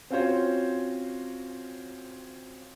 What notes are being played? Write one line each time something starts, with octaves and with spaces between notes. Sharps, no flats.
C4 C#4 F4 F#4 C5 C#5